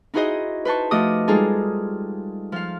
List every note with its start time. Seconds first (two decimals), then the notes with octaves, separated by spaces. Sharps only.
0.14 D#4 E4 F#4 G#4 C5 D#5
0.65 B4 C5 A5 C#6
0.91 F3 A3 F#4 D#5 D6 D#6
1.28 G3 G#3 D#4 F4 G#4 A4
2.52 F3 F5